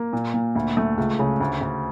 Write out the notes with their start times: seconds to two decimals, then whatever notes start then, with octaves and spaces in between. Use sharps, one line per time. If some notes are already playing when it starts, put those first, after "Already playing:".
Already playing: A#3
0.13 A#2
0.34 A#2
0.55 D2
0.77 A3
0.97 C#2
1.19 C#3
1.40 D2
1.61 D2